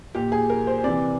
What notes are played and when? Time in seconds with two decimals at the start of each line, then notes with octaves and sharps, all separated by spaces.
0.15 A#2 G4
0.32 G#4
0.50 A#4
0.67 C5
0.84 C3 E3 D5